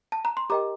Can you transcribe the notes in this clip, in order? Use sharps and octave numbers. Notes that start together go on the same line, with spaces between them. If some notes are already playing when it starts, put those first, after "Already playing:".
A5
A#5
C6
G4 A#4 D#5 G5 A#5 D6